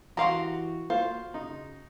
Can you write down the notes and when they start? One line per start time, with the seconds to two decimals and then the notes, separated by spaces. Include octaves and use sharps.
0.17 E3 F#4 G4 F5 A#5 C6 C#6
0.90 A#3 F4 C5
1.34 C#3 D#4